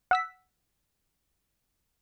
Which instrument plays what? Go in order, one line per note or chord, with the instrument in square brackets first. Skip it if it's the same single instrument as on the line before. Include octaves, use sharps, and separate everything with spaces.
[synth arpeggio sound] F#5 E6 B6